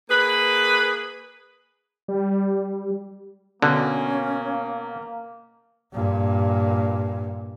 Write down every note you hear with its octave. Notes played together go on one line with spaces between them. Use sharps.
A#3 G#4 B4
G3
B2 D3 A#3 C#4
G2 A#2